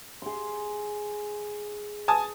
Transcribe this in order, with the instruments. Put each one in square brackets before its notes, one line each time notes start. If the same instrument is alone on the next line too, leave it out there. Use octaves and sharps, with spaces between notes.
[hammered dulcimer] G#4 C6
[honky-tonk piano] G#5 A5 D#6